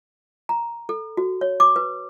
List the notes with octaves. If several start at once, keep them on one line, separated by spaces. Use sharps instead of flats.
A#5
A4
F#4
C#5
D6
B4